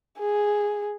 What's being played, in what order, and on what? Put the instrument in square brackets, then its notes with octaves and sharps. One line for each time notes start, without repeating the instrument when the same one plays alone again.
[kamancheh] G#4